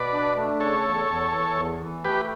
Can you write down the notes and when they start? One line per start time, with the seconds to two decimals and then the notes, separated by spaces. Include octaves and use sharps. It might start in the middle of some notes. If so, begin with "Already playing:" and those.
Already playing: B2 B4 D5
0.13 D4
0.36 A3
0.60 C#3 A4 C#5
0.84 E2
1.09 E2
1.33 E3
1.57 E2
1.81 E3
2.04 A3 G4 B4